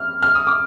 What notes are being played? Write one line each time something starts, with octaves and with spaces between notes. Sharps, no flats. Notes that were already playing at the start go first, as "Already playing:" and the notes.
Already playing: F6
F6
D#6
D6